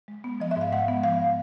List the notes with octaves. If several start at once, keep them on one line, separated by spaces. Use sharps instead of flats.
G#3
B3
F3 D#5
G#2 E5
F5
G#3 F#5
B3
F3 F5